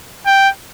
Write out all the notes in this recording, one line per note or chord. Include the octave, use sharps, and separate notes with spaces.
G5